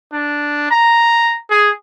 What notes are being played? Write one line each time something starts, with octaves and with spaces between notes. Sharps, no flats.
D4
A#5
G#4